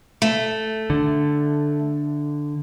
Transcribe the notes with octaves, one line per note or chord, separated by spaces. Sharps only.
A3
D3